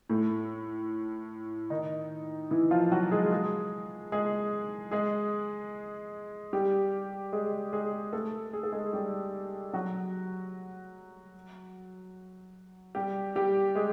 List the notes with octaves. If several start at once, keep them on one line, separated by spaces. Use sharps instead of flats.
A2 A3
D#3 D#4
E3 E4
F3 F4
F#3 F#4
G#3 G#4
G#3 G#4
G#3 G#4
G#3 G#4
G3 G4
G#3 G#4
G#3 G#4
A3 A4
G#4
A4
G#3 G#4
G3 G4
F#3 F#4
G3 G4
G3 G4
G#3 G#4